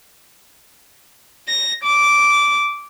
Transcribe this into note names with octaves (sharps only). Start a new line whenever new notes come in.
A#6
D6